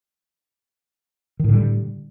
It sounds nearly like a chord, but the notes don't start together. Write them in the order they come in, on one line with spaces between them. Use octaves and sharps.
D#3 A2 D3 G3